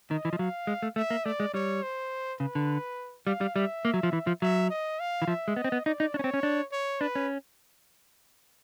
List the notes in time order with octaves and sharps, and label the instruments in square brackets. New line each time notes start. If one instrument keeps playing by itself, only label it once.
[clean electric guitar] D#3 [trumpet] D#5
[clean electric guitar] E3
F3
[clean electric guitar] F#3 [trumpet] F5
[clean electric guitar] G#3
A3
[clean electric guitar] A3 [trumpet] E5
[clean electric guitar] A#3
[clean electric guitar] A3 [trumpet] D5
[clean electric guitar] G#3
[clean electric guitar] G3 [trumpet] C#5
[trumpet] C5
[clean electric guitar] C#3 [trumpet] B4
[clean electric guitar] D3
[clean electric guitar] G3 [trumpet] F5
[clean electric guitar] G3
[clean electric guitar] G3 [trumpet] E5
[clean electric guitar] A#3
F#3
F3
E3
F3
[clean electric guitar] F#3 [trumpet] E5
[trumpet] D#5
F5
[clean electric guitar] E3
[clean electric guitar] F3 [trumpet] E5
[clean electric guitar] G#3
[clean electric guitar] B3 [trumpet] D#5
[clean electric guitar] C4
B3
[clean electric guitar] D#4 [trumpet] D5
[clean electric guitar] D#4
[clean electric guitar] D4 [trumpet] C#5
[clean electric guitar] C#4
C4
C#4
D4
[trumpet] C#5
[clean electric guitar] D4 [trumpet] B4
[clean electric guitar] C#4